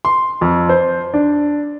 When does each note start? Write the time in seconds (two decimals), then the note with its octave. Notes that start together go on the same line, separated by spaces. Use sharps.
0.05 C6
0.41 F2
0.69 C5
1.14 D4